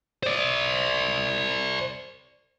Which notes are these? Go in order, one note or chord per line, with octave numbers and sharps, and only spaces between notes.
C5 D5